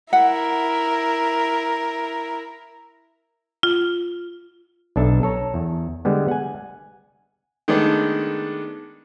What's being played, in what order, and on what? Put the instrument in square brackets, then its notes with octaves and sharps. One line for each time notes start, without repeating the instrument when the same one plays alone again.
[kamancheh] E4 A#4 [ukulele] F#5
[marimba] F4
[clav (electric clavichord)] B1 D4 A4 E5 A5
A4 C#5 A#5
E2
D3 G3 G#3 B3
F#5 G#5
[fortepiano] D#3 G#3 A3 B3 D4